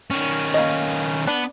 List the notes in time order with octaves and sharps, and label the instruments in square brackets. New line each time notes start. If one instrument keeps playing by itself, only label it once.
[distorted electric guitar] D#3 C#4
[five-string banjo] A#3 D#5
[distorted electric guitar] B3 [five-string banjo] D4